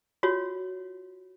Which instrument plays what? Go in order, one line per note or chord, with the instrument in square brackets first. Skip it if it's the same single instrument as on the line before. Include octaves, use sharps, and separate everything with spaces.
[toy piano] F4 F#4 C#5